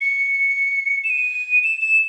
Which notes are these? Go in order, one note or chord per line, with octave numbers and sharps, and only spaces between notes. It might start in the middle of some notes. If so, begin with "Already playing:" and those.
C#7
E7
D#7
E7
E7